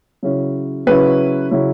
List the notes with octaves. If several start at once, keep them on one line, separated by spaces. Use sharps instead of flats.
C#3 F#3 C#4 E4
C#3 F#3 C#4 E4 B4
C#3 F#3 C#4 E4